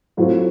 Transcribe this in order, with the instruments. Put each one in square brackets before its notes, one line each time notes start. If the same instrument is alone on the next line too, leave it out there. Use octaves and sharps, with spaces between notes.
[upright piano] A2 F#3 A3 C4 F4